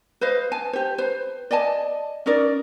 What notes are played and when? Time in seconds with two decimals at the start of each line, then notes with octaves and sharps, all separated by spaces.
0.21 B4 C5 D#5 F5
0.52 G#5 A5
0.73 G4 C5
0.98 B4 C5
1.51 D5 D#5 G#5 A5
2.26 C#4 D#4 A#4 D5